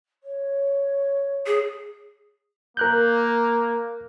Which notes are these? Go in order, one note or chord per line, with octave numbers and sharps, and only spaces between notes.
C#5
G#4
A#3 A#4 F#6 G6